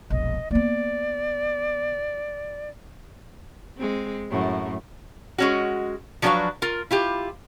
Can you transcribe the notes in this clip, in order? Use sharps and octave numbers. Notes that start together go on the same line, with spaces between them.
E1 A#1 D#5
A#3 B3 D5
G#3 C4
F#2 A2
G#3 C#4 F#4
F3 F#3 D4 F#4 B4 F5
F4 A#4
E4 F4 G4